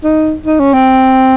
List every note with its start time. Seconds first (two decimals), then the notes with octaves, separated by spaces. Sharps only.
0.04 D#4
0.46 D#4
0.59 C#4
0.74 C4